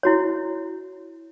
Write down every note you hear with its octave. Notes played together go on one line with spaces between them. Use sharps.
E4 F#4 C#5